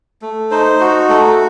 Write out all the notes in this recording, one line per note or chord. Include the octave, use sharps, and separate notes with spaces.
A3
D#4 C5
F#4
A3